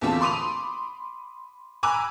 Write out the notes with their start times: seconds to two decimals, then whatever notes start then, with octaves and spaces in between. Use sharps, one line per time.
0.01 E2 D3 A3 C4 F4 A5
0.21 B5 C6 D6 D#6 D#7 F7
1.83 G#5 A#5 B5 D6 E6 F#6